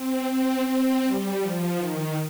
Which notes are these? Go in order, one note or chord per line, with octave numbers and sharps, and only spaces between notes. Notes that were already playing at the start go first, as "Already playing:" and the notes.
Already playing: C4
C4
C4
G3
F3
D#3